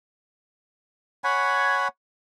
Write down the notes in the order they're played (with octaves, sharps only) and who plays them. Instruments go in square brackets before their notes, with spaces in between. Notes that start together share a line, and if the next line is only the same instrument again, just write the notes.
[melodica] C#5 F#5 G#5 B5